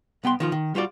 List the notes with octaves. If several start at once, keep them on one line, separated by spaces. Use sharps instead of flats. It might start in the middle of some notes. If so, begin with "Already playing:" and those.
C2 B3 G5 C6
D#3 F3 F4
D#3
G3 F4 F#4 D5